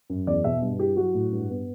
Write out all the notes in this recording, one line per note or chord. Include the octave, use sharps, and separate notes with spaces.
F#2
E2 D5
B2 E5
G2
E4 G4
F#3 F#4
A2
G2
B3